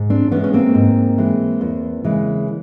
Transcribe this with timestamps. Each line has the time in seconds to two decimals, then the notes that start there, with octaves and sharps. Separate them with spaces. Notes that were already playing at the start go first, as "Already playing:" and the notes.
Already playing: G#2
0.10 C4 D4
0.31 E3 B3 C#4
0.36 G#3
0.44 C#4
0.53 A#3 C4
0.74 G#2
1.18 E3 G#3
1.61 E2
2.04 C#3 E3 G#3